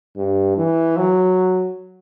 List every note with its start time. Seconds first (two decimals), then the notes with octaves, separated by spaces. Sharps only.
0.16 G2
0.57 E3
0.97 F#3